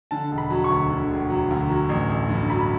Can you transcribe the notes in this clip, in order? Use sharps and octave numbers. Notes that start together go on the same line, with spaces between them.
D3 A5
E1
B5
F#3
C#6
D2
D3
E1
F#3
D2
F#3
A1
A1
G2
F#3 B5